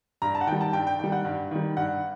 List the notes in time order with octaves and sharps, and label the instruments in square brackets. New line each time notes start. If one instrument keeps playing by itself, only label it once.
[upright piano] G2 A#5
A5
F#5
D#3 G3 G5
A5
G2 G5
G5
D#3 G3 G5
F#5
G2
D#3 G3
G2 F#5